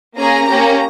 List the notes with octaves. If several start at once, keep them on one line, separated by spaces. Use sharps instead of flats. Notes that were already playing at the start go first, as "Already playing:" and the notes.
A#3 C#4 G#4 A#5
A#3 C#4 G4